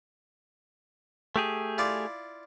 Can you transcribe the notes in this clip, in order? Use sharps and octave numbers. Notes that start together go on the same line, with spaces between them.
A3 G4 G#4
E4 F4 D5